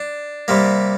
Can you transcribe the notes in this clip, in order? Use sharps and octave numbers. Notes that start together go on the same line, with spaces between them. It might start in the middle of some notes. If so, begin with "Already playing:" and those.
Already playing: D4
C3 G3 A#3